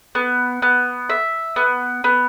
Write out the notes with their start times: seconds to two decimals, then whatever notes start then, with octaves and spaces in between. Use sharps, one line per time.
0.15 B3
0.62 B3
1.09 E5
1.56 B3
2.04 B3